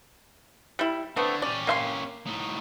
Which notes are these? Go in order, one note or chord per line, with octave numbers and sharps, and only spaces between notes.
G3 E4
D3 A3 B3 C4
C#4 G4 D5
A#3 E5 C6
A2 D#4